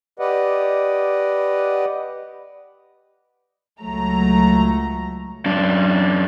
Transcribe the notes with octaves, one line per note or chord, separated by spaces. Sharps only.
G4 B4 D5 D#5 F#5
C#2 F#3 A3 A#5
F#2 D4